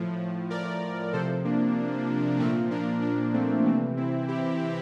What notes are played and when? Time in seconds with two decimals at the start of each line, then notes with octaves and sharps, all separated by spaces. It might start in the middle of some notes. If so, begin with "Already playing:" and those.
Already playing: A2 F3
0.50 A#4 D5
1.13 C3 F3 A4 C5
1.44 A#3 D4
2.39 A#2 F3 A3 C4
2.71 A#3 D4
3.02 A#3 D4
3.34 A3 C4
3.65 C3 E3 A3 C4
3.97 C4 E4
4.28 E4 G4